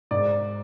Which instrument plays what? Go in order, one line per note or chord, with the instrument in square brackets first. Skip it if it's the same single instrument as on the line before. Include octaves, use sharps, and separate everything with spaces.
[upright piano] G#2 D5